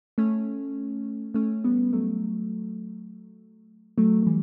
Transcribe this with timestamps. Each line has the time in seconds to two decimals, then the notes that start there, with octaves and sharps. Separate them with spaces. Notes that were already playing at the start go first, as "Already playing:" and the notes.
0.18 A3 C#4
1.34 A3 C#4
1.64 G3 B3
1.93 F#3 A3
3.98 F#3 A3
4.23 A3
4.26 E3 G3